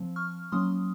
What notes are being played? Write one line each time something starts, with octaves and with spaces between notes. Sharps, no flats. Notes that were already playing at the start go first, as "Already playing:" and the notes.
Already playing: F3 C4
C#6 F6
F#3 A#3 C#4 C6 D#6